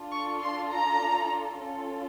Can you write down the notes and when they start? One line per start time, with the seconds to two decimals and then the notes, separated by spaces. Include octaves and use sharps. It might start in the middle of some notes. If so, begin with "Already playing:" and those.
Already playing: D4 F4 A4
0.12 C#6
0.42 C6
0.72 A#5
1.62 C#4 F4 A4